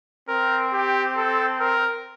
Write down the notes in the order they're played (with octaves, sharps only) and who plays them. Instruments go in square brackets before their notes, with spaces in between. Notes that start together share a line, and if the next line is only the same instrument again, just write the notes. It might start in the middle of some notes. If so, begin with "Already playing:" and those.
[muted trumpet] C4 [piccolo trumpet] A#4
[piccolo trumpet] G4
A4
A#4